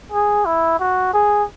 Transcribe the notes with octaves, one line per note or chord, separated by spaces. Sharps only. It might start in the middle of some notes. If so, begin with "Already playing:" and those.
G#4
E4
F#4
G#4